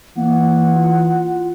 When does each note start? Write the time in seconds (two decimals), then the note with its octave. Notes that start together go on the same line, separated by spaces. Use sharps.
0.17 E3 A#3 F#5
0.76 F4